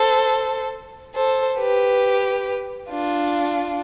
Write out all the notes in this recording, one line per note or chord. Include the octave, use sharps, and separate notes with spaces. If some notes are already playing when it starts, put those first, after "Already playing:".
Already playing: A4 C5
A4 C5
G4 B4
D4 F4